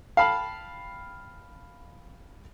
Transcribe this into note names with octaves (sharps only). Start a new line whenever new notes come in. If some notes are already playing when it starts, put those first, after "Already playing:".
F5 G5 A5 B5